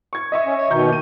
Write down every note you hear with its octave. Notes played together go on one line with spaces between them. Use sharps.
C#6 G#6
D#5 E5 C#6
C#4
C#5
B2 D#3 A#5 C#6 G6
A#3 D#7